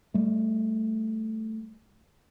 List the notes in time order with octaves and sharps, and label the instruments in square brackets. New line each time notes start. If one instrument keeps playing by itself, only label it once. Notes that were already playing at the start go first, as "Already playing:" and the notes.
[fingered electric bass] G3 A3